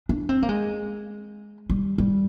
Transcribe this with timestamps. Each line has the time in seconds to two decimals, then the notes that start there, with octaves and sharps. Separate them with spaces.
0.09 D4
0.29 C4
0.42 A#3
0.49 G#3
1.70 G3
1.98 G3